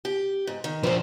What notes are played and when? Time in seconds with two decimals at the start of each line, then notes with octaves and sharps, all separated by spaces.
0.05 G4
0.47 G#2
0.64 D#3
0.83 F3 D4 B4 C5